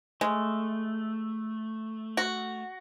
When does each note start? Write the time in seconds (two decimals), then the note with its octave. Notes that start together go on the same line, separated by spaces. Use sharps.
0.21 G#3 A3
2.17 F#4